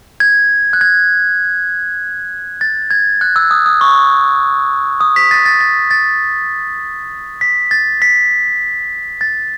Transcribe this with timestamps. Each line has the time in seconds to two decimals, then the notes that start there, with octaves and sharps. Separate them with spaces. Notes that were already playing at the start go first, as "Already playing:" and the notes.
0.20 G#6
0.73 F#6
0.81 G#6
2.61 A6
2.91 G#6
3.21 F#6
3.36 E6
3.51 D#6
3.66 D#6
3.81 C#6
5.01 D#6
5.16 B6
5.31 A6
5.46 A6
5.61 A6
5.91 A6
7.41 B6
7.71 A6
8.02 B6
9.21 A6